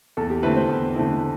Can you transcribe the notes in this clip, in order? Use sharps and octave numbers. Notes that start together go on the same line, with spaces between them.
E2 A4
G4
D3 A3 C4 E4 B4
C5
E2
D3 A3 C4 E4